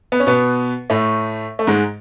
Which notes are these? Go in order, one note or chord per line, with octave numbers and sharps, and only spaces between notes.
B3
C#4
B2 B3
A2 A3
A3
G#2 G#3